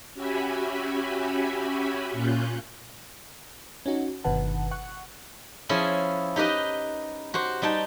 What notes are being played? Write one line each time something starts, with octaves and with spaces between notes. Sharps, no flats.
C#4 F#4 G4 E5 G#5 B5
A#2 C#4 F4 F#6 G6
C#4 D#4 F#4
G1 B2 D#3 B4 F#5 A5
F#5 C#6 F#6
F3 C#4 E4 G#4 G#5
D#4 G4 B4 D#5
F#4 G4 C5
G3 D#4 G5 A5